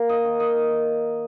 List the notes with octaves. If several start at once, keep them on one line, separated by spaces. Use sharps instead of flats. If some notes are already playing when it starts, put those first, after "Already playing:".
Already playing: A#3
D#5
D#3
D#5
D#3